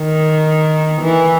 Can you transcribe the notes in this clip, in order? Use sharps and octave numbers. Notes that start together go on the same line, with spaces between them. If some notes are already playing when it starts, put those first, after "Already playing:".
Already playing: D#3
E3